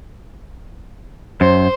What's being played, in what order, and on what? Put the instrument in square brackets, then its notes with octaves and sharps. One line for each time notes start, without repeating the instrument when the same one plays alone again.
[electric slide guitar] F#2 [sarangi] C5